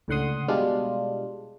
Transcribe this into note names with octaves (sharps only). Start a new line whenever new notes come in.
C#2 A2 D3 F#5 C6 D#6
B2 G3 G#3 D4 F4